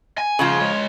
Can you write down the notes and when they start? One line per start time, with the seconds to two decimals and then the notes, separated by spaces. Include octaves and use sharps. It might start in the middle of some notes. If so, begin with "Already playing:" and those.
0.18 G#5
0.39 C#3 F3 F4 G#4 C5
0.60 G#3 C#5